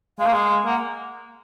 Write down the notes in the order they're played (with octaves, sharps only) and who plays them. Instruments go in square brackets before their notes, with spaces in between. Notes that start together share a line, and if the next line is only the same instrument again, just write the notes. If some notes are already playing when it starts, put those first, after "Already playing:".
[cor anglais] G#3 [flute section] F5
[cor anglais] A#3
G#3
[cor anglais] A#3 [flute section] F#5